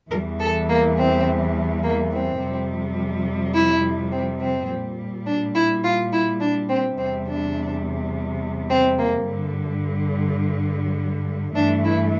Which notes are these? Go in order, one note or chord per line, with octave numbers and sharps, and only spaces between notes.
E2 E3 G3 A#4
A4
A#3
C4
A#3
C4
F2 C3 G3
E4
C4
C4
A#2 G3
D4
E4
F4
E4
D4
C4
E2 C3 G3 C4
D4
C4
A#3
G2 D3 G3
G2 E3 A3 D4
E4